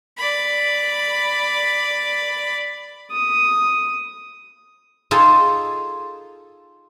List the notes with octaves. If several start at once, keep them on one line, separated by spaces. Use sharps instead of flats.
D5 B5
D#6
D#4 F4 G#4 A4 G#5 A5